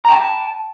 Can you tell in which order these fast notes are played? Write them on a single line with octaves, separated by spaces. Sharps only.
A#5 G5 A5